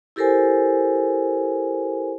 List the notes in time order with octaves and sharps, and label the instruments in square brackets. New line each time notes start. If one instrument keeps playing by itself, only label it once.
[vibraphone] E4 G4 A4 A#4 C5 G#5